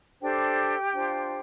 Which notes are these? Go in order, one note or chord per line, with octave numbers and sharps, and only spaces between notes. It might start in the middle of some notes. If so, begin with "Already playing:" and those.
D4 G4 A4 C5 G5
D4 F4 C5